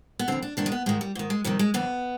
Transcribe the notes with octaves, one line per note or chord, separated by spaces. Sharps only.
B3
F2 D3 C4
D4
G#2 D#3 D4
G#3
B3
G#2 D#3 G#3
G3
G#2 D#3
G#3
F2 C3 D#3 G3
G#3
F2 D3 B3